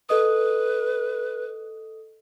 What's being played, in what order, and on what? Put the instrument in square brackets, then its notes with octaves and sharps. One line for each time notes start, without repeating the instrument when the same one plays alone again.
[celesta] A4 D#5 D#6 [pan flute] B4